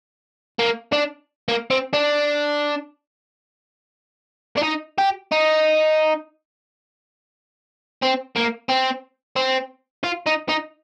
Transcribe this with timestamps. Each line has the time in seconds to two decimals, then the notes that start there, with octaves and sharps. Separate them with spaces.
0.59 A#3
0.93 D4
1.49 A#3
1.70 C4
1.93 D4
4.58 D4
4.63 D#4
4.98 G4
5.32 D#4
8.02 C4
8.36 A#3
8.69 C4
9.36 C4
10.04 F4
10.27 D#4
10.49 D#4